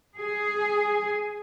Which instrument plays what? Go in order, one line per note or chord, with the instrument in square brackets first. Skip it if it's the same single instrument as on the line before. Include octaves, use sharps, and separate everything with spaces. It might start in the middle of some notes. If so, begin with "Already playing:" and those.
[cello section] G#4